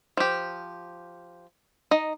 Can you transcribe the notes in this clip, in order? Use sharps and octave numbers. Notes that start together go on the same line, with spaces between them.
F3 G4
D#4 D#5